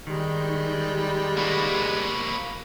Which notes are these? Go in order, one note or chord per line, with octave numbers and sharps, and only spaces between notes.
D#3 G3 G#3
A#3 F#4 B5